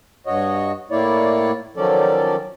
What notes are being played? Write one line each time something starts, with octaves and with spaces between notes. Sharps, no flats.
G2 F#4 C#5 D#5
A2 A#3 E4 C#5 D5
D#3 F3 F#3 C#4 A4 D5